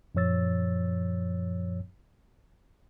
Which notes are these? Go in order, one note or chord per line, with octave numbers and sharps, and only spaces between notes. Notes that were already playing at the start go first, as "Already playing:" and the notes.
F#2 A#2 F3 C#5 E6 A6